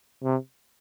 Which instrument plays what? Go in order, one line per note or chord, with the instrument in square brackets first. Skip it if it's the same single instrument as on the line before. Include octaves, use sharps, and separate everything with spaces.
[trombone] C3